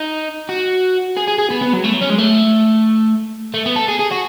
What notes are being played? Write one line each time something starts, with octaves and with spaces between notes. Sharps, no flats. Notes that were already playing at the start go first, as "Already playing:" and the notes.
Already playing: D#4
F#4
G#4
G#4
G#4
B3
B3
F#3
A3
F#3
C#4
G#3
A3
A3
B3
A4
G#4
G#4
F#4